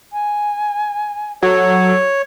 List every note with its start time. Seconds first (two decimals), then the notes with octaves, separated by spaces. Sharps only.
0.13 G#5
1.43 F#3 A4 C#5